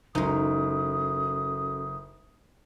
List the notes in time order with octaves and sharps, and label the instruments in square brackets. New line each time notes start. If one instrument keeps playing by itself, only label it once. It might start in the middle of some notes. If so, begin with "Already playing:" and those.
[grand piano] F#1 [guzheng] G#3 D#4 [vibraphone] C#4 F#4 A4 [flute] D#6